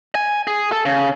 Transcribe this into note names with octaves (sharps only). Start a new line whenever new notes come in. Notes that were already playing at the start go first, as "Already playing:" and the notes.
G#5
G#4
A4
C#3